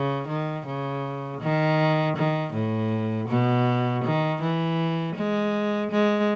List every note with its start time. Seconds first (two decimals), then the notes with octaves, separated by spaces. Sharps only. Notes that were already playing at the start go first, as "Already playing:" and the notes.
Already playing: C#3
0.28 D#3
0.66 C#3
1.41 D#3
2.17 D#3
2.53 A2
3.29 B2
4.04 D#3
4.41 E3
5.15 G#3
5.91 G#3